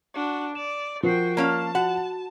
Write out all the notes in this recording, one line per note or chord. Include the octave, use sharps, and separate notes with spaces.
D4 F#4
D5 E7
F3 F#4 A#4 G5 C7
A#3 C#4 F5 A5
F#4 F#5